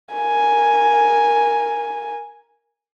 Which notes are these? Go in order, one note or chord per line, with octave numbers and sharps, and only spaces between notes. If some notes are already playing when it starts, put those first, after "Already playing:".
A#4 G#5